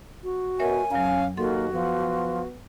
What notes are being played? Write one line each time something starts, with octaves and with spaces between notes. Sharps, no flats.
F#4
B2 A#4 C#5 E5 G#5
F#2 F#3 C#4 F5
D#2 A#3 F#4 A4 F#5 C6
F3 B3